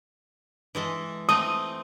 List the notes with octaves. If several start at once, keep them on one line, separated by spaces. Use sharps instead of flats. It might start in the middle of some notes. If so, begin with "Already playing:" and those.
E3 G#3 A4
A3 C4 D#6